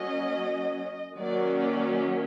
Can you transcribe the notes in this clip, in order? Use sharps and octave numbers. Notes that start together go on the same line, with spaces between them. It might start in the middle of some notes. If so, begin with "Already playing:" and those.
Already playing: F#3 A#3 C#4 D#5
D#3 F#3 A#3 C#4 D5
D5